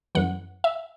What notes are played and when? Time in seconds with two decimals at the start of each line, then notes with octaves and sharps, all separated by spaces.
0.15 F#2 E3 F#5
0.64 E5